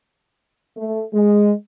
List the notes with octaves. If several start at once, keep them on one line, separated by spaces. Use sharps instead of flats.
A3
G#3